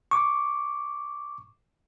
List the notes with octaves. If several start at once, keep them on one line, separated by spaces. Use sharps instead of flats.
C#6 D6